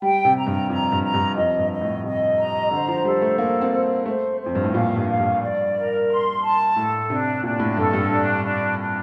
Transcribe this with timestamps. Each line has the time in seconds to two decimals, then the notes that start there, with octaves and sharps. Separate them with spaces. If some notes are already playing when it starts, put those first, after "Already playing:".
0.02 G3 G5
0.25 C3
0.36 A#5
0.47 G2
0.69 F2 A#5
0.92 G2
1.03 A#5
1.14 G2
1.36 F2 D#5
1.59 G2
1.70 D#5
1.81 A2
2.04 C3 D#5
2.37 A#5
2.71 D3 C5
2.88 F3
3.05 G3 A4
3.22 A3
3.38 A#3 C5
3.61 C4
3.72 C5
4.06 A3 C5
4.39 C5
4.46 F2
4.55 G2
4.64 A2
4.73 A#2 F5
4.96 G2
5.07 F5
5.19 G2
5.41 D5
5.74 A#4
6.09 C6
6.42 A5
6.76 A2 A4
7.09 C3 D4
7.43 A#2 D4
7.59 A2
7.77 G2 A4
7.93 G2
8.10 D4
8.44 D4
8.78 D4